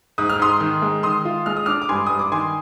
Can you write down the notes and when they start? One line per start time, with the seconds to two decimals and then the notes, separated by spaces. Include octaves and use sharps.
0.18 G#2 D#6
0.29 F6
0.39 G#2 C6 D#6
0.60 D#3
0.82 G#3
1.03 D#3 C6 D#6
1.25 F4
1.46 G#3 F6
1.56 D#6
1.66 D4 D6 F6
1.82 D6
1.89 G2 G#5 C6
2.06 G2 D#6
2.19 D6
2.32 D#3 G#5 C6